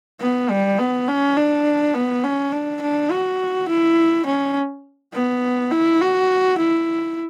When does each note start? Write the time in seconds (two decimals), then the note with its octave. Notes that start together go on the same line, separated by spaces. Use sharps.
0.21 B3
0.50 G3
0.79 B3
1.08 C#4
1.37 D4
1.95 B3
2.24 C#4
2.52 D4
2.82 D4
3.12 F#4
3.69 E4
4.26 C#4
5.13 B3
5.72 E4
6.01 F#4
6.59 E4